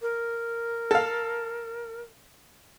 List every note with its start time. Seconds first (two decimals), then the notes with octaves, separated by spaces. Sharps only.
0.01 A#4
0.91 A4 F5